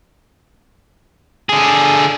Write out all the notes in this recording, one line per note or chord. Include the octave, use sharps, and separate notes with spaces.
D3 G#4